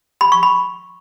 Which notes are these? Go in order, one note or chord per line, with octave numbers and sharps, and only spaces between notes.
B5
C#6
B5